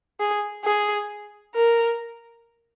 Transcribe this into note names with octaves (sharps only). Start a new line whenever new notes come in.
G#4
G#4
A#4